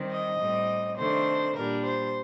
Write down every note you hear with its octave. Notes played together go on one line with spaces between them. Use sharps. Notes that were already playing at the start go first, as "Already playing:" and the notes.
Already playing: D#3 G3 C4
D#5
A2 G3 C4
C3 D#3 A3 D4 C5
A#2 G3 D4 A#4
C5